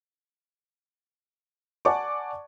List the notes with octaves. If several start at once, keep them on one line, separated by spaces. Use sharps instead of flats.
D5 F#5 G#5 A5 C#6 D6